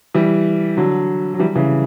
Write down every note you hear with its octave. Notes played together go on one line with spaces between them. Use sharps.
E3 G3
D3 F#3
F#3
E3 G3
C#3 E3